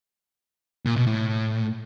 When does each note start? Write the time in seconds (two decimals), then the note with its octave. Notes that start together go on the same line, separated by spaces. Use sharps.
0.86 A#2
0.96 B2
1.07 A2